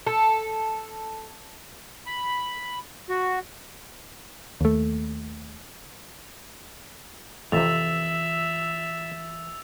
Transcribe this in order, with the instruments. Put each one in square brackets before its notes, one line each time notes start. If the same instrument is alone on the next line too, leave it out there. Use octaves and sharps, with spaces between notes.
[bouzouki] A4
[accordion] B5
F#4
[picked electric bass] D#2 A3
[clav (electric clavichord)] F2 C3 [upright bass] E3 F4 [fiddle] E5 [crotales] E6 A6 F7